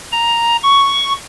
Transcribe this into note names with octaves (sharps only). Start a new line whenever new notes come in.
A#5
C#6